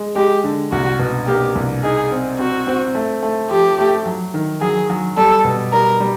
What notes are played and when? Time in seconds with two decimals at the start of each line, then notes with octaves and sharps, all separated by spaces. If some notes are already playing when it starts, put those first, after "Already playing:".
Already playing: G#3
0.15 G#3 G4
0.44 D3
0.72 C2 F#4
0.99 B2
1.27 A#3 G4
1.55 C2
1.84 D#4 G#4
2.11 C4
2.39 C4 F#4
2.67 C4
2.95 A3
3.23 A3
3.51 F3 G4
3.78 A3
4.06 F#3
4.34 D#3
4.61 F#3 G#4
4.90 F#3
5.17 G3 A4
5.45 B2
5.72 G3 A#4
6.00 G3